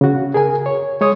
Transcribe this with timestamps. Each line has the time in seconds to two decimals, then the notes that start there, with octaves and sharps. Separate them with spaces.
0.01 C#3 F#4
0.34 G#4 A#4 G#5
0.66 C#5
1.01 G#3 C#5 D#6